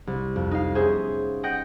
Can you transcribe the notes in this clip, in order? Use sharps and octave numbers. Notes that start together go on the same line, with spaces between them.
C2
F2
D#4 F5
B3 C#4 G#4 C5 E5
D#5 F#5 G5 G6 A#6